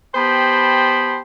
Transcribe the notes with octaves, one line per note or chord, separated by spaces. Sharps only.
B3 G4 C5 G5 A5 B5